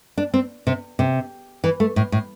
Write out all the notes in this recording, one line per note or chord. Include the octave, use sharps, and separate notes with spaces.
D4
C4
C3
C3
E3
A3
A2
A2